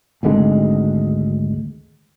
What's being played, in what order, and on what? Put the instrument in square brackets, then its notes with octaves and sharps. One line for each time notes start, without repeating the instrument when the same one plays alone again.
[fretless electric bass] G#1 D2 D3 G#3